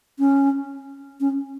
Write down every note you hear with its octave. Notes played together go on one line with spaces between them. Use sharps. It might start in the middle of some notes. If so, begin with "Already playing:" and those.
C#4
C#4